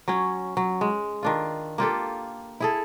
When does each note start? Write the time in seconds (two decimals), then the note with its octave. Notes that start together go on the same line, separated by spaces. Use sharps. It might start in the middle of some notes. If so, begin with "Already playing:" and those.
0.08 F#3 C#4
0.57 F#3
0.81 G#3
1.23 D#3 D4 F4
1.78 A#3 F4 G4 A4
2.60 E4 G#4 A4